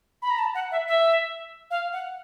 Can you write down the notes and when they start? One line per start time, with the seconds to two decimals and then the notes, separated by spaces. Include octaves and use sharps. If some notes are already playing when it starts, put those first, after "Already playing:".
0.22 B5
0.30 A#5
0.39 A5
0.55 F#5
0.71 E5
0.88 E5
1.71 F5
1.93 F#5